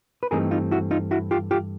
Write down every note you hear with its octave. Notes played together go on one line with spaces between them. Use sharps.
B4
G2 E3 A3 C4 D#4 G#4 A#4
D#4 F4
E4 F#4
D#4 F4
E4 F#4
F4 G4
F4 G4